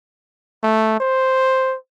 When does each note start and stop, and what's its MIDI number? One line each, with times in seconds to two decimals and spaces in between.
0.63 0.95 57
1.00 1.75 72